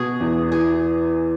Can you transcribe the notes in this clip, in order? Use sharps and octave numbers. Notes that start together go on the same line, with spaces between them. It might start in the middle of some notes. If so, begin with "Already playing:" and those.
Already playing: B2 F#4 G#4
E2
E3 G#4